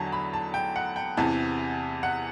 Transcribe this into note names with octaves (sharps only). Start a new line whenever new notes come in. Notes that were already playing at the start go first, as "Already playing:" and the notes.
Already playing: E2 D3 F#3 A5
B5
A5
G5
F#5
G5
E2 C3 E3 A5
F#5